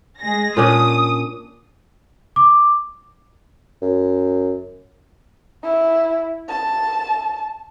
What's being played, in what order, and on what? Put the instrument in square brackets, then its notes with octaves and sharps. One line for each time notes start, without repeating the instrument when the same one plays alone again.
[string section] G#3 G#4 A#6
[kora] A#2 C#4 D4 [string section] D#6
[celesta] D6
[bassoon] F#2
[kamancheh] E4
A5